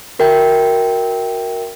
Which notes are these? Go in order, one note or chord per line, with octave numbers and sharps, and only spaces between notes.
F#4 A#4 E5 G5